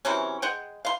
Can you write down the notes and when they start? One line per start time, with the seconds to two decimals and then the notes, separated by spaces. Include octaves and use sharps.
0.05 C3 E3 F#3 C#4
0.42 G#3 F#5 G5
0.85 F5 C6